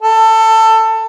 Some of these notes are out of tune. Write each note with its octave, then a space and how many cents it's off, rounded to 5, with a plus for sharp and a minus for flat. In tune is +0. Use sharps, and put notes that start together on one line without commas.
A4 +20